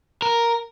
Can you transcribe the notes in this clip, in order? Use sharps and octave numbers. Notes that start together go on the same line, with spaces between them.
A#4